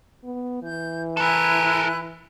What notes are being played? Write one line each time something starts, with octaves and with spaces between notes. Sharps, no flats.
B3
E3 G6
E4 A4 A#4 G#5 F#6